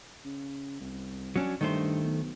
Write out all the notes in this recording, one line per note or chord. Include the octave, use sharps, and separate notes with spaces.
C#3
C2
F#3 C#4 D4
G2 D#3 A3 C5
B1